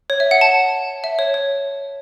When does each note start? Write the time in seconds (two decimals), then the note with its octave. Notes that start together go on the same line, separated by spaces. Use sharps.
0.10 C#5
0.20 E5
0.31 F#5
0.41 A5
1.04 E5
1.19 C#5
1.34 C#5